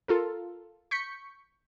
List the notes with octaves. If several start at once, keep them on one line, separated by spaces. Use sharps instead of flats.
F4 A4 A#4
C#6 G6 B6 C#7